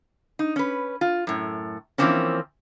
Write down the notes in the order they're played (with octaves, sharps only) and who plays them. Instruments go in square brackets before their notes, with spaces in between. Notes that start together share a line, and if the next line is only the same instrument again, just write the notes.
[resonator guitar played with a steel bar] D#4
C#4 B4
F4
F#2 A2
E3 F3 A#3 C4 C#4